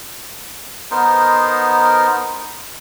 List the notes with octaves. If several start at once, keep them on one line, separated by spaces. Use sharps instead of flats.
B3 D#4 A#4 C5